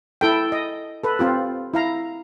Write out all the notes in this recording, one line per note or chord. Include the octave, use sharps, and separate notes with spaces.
E4 A4 G5
D#5
A4 B4
C4 F4 G4
E4 F5 A#5